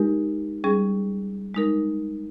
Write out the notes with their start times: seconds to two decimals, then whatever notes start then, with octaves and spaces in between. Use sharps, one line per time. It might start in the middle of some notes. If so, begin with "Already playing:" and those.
Already playing: G#3 D#4 G4 A#4
0.64 G3 C#4 G#4
1.54 G#3 D#4 A#4